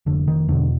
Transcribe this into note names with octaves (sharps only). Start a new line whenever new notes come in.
F1 D3
D#3
E2 B2 D3